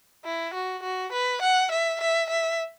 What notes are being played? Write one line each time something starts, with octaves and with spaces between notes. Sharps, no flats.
E4
F#4
F#4
B4
F#5
E5
E5
E5